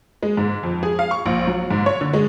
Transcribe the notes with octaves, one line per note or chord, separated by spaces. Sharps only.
G#3
G#2
F2
G#4
F5
C#6
A#1
F#3
G#2
C#5
D3
G#3